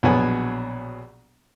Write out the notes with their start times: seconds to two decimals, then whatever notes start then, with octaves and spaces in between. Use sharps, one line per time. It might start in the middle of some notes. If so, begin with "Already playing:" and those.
0.03 A#1 B2 F#3 B3 G#5